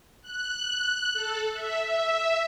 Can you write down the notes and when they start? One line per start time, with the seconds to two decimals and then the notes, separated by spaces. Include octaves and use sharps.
0.22 F#6
1.13 A4
1.53 E5
1.86 E5